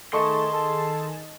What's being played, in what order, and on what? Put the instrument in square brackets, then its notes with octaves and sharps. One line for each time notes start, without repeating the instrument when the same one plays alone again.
[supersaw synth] D#3 G#4 A5 [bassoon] A3 [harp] D#5 C#6 [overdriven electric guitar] C6
[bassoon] A4